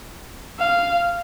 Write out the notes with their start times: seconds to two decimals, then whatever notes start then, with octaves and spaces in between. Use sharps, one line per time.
0.59 F5